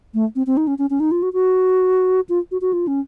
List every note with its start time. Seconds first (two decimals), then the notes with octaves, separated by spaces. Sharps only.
0.14 A3
0.36 C4
0.47 C4
0.57 D#4
0.67 C#4
0.78 C#4
0.90 C#4
1.00 D#4
1.11 F4
1.23 F#4
1.33 F#4
2.29 F4
2.51 F#4
2.61 F#4
2.73 F4
2.87 C#4